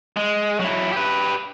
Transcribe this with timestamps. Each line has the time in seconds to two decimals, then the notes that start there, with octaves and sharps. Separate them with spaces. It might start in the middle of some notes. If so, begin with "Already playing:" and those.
0.17 G#3
0.60 F#3 E4
0.92 G4 B4